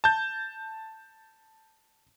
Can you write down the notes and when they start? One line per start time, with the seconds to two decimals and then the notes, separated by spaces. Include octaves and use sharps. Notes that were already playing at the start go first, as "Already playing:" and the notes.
0.04 A5 G6